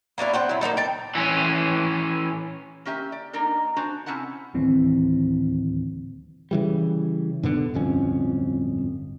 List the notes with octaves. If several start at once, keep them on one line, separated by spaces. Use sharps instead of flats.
A#3 C#4 D4 E4
C4 F#5 G5
F#3 E4
A#3 B3 D#4 A4
G5 A5
E3 C#4
A#3 C#4 G4 E5
D5
A#3 D4 D#4 A#4
D4 F#4 C5 G#5 A#5
C3 C#4 E4 F#5 A5
D1 D#2 E3 C4
C#3 E3 G3
G2 B2 D3
D1 G1 F2 C#4